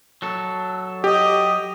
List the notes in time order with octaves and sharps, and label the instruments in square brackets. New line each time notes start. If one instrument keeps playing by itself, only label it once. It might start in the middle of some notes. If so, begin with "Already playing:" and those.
[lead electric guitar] F#3 A4
[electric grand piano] G4 [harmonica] D#5